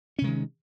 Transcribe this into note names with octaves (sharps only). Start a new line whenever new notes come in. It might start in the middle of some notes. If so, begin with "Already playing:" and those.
C3 D#3 G#3 C#4